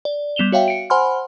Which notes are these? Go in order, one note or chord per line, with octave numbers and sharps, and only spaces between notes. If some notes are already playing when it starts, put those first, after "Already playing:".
D5
G3 B3 E7 F7 G7
F#4 C#5 E5 F5 G5
C#7 D7
C5 F#5 G#5 B5 C6 F6